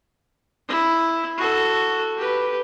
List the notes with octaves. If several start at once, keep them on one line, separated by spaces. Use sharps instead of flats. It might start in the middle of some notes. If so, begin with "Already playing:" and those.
E4
F#4 A4
G4 B4